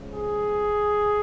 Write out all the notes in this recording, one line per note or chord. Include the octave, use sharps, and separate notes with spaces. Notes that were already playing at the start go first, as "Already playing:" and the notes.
Already playing: C#3 F3 G#3
G#4